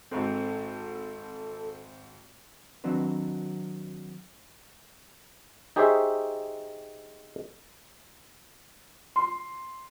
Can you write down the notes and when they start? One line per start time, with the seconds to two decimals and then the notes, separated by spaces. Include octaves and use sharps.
0.11 G#1 G#2 C4 A4
2.84 D#3 F#3 C4 D4 F#4 B4
5.76 D#4 G4 G#4 C5 C#5 E5
9.16 C6